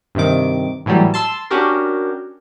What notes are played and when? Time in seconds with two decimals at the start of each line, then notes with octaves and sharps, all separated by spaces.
0.15 G2 C3 D#3 D6
0.86 A2 E3 F#3 G3
1.14 A5 C6 E6
1.50 C#4 D4 F#4 G4 A#4